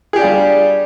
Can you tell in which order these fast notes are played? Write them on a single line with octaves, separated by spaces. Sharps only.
G#4 G4 D4 F4 G3